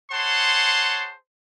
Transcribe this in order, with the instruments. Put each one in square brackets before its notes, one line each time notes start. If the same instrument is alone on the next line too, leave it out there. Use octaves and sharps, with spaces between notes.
[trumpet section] G#4 C5 C#5 F#5 A5 C6